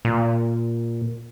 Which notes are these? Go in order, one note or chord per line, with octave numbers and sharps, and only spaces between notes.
A#2